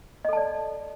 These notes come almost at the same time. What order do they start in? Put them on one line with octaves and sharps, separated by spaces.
D#5 A4 A5 D5